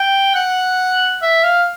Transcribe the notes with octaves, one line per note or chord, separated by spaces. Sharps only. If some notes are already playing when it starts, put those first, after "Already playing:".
Already playing: G5
F#5
E5
F5